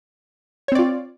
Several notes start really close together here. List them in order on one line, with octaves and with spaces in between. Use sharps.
C#5 C4 D5 F4